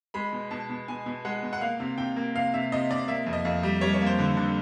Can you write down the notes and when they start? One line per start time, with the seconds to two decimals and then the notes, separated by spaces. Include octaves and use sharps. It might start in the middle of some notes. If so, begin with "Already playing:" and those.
0.14 G#3 B5
0.33 B2
0.51 B2 A5
0.70 B2
0.88 B2 G#5
1.06 B2
1.25 G#3 F#5
1.43 B2
1.53 F#5
1.61 A#3 F5
1.80 C3
1.98 C3 G5
2.16 A#3
2.35 C3 F5
2.54 C3 E5
2.72 C3 D#5
2.90 C3 D5
3.08 A#3 E5
3.26 F2
3.33 D#5
3.45 F2
3.63 G3
3.81 G3 C#5
3.94 C#5
4.01 A#3
4.06 C5
4.19 D3
4.37 D3